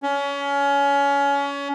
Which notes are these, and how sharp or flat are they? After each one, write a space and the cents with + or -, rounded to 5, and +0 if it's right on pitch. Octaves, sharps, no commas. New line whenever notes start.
C#4 +25